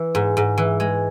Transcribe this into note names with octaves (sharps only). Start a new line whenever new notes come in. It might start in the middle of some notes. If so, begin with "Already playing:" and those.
Already playing: E3
G#2
G#2
E3
G#3